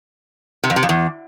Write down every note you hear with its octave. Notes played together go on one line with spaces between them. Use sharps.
C3
F2
C3
F2
E2